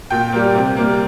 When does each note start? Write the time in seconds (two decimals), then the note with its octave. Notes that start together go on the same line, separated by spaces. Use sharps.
0.10 A#2 G5
0.32 G3 A#3
0.55 C3
0.77 G3 A#3